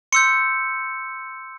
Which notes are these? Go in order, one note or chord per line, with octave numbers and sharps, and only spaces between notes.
C6 E6 G6 C#7